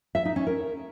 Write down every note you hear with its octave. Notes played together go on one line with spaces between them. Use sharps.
E5
D#4
C#4
A#4